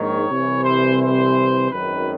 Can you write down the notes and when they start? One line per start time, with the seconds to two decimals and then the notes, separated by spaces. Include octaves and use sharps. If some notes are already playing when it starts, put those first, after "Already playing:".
Already playing: A#1 G#2 D#3 C#5
0.28 C2 C3 E3
0.64 C5
0.99 C5
1.71 G#1 F#2 D#3 B4